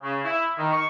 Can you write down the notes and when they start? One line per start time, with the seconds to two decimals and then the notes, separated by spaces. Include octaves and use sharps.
0.03 C#3
0.24 E4
0.57 D#3
0.72 C#6